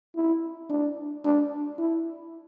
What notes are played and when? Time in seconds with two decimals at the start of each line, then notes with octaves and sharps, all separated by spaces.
0.16 E4
0.70 D4
1.24 D4
1.78 E4